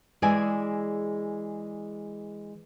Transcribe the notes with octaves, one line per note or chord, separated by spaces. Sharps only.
E3 G#3 G#4 D5 E5 G#5